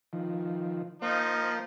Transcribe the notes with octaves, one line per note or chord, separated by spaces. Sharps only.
D#3 F3
F3 A#3 D#4 C5 F5